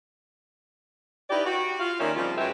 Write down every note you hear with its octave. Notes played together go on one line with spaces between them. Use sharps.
D#4 E4 G4 B4 D5
F#4 G4
F4 F5
D#3 A#3 C#4 G4 D5 E5
C#3 F3 G3 C4 F4
F#2 F#3 G#3 G4 B4 E5